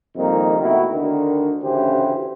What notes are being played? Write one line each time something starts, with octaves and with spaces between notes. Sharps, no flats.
C2 F2 D#3 G3 A#3 D#4
B2 D#3 A3 E4 F#4
D2 D3 D#3
A1 D2 C#3 E3 G4 C5